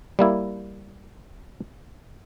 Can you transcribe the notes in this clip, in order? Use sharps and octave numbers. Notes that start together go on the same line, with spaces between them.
G3 A#3 E4